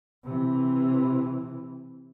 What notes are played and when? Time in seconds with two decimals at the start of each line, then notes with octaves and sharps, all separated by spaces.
0.24 C3 E3